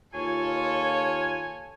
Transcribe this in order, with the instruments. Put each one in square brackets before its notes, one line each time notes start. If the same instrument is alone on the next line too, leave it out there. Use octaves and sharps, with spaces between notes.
[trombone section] D#2 F4 [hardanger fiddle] A4 C#5 [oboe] G#5